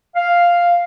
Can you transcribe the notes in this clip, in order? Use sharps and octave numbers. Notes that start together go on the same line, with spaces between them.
F5